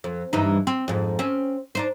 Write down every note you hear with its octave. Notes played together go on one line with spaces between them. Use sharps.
F2
G2 E3 D#4
C4
F2 G#2
C4 C#4
D4 D#4 C5